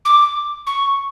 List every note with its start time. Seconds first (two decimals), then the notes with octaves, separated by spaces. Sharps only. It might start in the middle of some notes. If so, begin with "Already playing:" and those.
0.05 D6
0.67 C#6